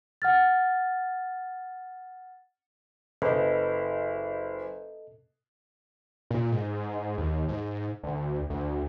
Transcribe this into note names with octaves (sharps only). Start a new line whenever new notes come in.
F#5 F6 A6
F#1 A4 B4 D#5
A#2
G#2
D#2
G#2
D2
D2